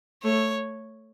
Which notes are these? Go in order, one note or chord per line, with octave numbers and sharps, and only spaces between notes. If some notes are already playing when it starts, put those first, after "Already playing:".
A3 C#5